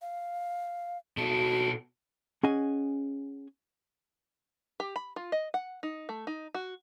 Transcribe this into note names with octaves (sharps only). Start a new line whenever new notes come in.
F5
B2 F#4 A4
C#4 G#4 D#5 F#5 G#5
G4
B5
F4
D#5
F#5
D#4
A3
D#4
F#4